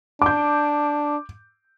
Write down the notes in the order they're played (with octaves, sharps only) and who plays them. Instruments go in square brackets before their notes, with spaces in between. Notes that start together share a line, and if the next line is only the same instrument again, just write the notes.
[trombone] D4 [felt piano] D6 G6